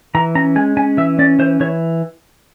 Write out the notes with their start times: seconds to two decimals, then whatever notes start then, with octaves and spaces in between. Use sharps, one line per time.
0.15 E3 A#5
0.35 C#4 A#5
0.56 G#3 G#5
0.77 C#4 G#5
0.97 E3 E5
1.19 C#4 D5
1.39 E3 C5
1.60 E3 C#5